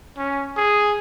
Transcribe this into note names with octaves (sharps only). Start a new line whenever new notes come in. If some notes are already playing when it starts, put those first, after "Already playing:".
C#4
G#4